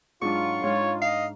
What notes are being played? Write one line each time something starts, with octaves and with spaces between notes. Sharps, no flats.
G#2 F#3 D4 F4 C#6
G#2 C#5
D#5 F5